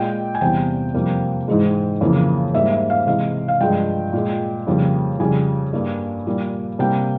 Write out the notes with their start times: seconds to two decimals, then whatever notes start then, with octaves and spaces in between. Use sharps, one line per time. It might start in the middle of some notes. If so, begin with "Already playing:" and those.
Already playing: A#2 G#3 G5
0.35 G#5
0.41 E2 C3 E3 G3 G5
0.94 F2 C3 G3 A#3
1.48 G#2 E3 G#3
2.01 F2 C#3 E3 A#3
2.54 G#2 G3 A#3 E5
2.71 E5
2.90 F5
3.07 C3 E3 G#3 F5
3.48 F5
3.60 G2 F3 G#3 G5
4.13 A#2 G#3
4.67 F2 C#3 G3 A#3
5.19 F2 C#3 G3 G#5
5.73 G2 G3 A#3
6.26 A#2 G3 A#3
6.79 C3 G3 A#3 G5